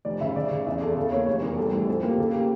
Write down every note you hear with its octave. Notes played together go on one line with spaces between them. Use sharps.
F1 D5
C#3 E5
C#3 D5
C#3
E2 E5
E2 A4
C#3 A4
A#3 C#5
F1 C#5
E2 A#4
G3 A4
A1
F2 A4
A#3 G4
C#3 A4
A#3 G4